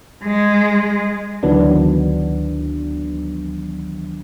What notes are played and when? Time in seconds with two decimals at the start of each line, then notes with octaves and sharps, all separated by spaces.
0.25 G#3
1.43 D2 D#3 E3 F#3 B3 D4